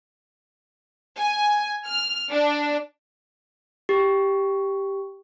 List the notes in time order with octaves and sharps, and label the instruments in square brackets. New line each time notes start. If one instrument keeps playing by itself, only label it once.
[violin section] G#5
F6
D4
[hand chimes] G4